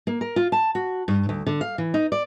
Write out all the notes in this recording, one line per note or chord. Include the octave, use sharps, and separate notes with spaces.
A#3
A#4
F4
A5
F#4
G2
D2
D3
F5
E3
D#4
D5